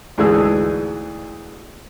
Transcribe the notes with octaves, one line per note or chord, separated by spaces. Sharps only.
D2 G#2 E3 D4 G#4 E6